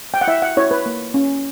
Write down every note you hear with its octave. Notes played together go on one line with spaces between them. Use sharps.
G5
F#5
E4 E5
F#5
E4 C#5
B4
A#3
C#4